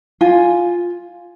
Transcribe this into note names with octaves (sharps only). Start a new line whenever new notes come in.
F4 G#5